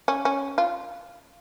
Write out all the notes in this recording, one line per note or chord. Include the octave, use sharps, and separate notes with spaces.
C#4
C#4
F4